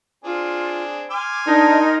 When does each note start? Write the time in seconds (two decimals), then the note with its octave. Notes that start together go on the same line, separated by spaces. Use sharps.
0.24 C4 D4 F4 G#4
1.10 G#5 C6 D6 F6
1.47 D4 D#4 A#4